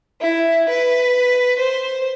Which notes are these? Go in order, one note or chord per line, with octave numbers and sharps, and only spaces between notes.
E4
B4
C5